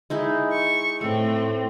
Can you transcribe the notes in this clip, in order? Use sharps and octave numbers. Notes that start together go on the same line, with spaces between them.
G#3 D#4 E4
C#6
A2 A3 C4